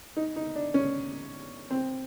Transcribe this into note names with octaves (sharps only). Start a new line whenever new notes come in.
D#4
D#4
D4
C#4
C4